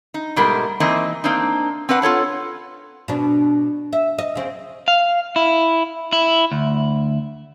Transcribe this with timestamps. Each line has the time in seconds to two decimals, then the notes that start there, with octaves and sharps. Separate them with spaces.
0.14 D#4
0.36 G#2 B2 G3 A3 A#4
0.80 E3 A#3 C4 D#4 D#5
1.24 A#3 C4 D4 D#4
1.89 C4 D4 B4 F#5
2.02 F4 A4 C#5 F#5
3.08 B2 D4
3.93 E5
4.18 D#5
4.35 C#3 C4
4.88 F5
5.36 E4
6.13 E4
6.52 D2